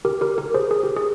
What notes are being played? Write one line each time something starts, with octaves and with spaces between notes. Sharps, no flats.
G4 A#4
G4 A#4
G4 A#4
G#4 C5
G#4
G4
G#4